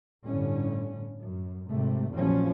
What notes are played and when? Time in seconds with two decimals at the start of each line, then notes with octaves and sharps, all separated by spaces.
0.25 G1 A2 D3 C#4
1.24 F#2
1.69 G#1 C3 A3
2.13 F1 A#1 E2 F3 F#3 C#4